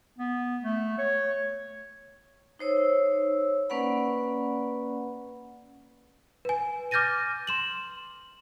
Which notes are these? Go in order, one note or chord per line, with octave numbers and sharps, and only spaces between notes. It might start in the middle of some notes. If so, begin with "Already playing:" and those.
B3
A3
C#5
D#4 C5 C#5 E6
A#3 C#4 B4 D5 F#5 B5
B4 G#5
D6 F6 G6 A6 A#6 D#7
C6 E7 F#7